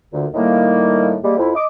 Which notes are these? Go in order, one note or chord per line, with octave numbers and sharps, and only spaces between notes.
D2 A#2 D3
A2 D#3 G3 A#3
G3 G#3 A#3
F2 E4
D#5 D6